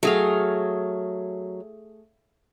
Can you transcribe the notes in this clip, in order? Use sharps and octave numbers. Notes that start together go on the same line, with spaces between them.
F#3 A3 G#4 F5